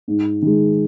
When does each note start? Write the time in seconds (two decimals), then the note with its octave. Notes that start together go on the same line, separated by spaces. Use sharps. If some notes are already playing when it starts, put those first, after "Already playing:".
0.08 G#2
0.42 D#3 G#3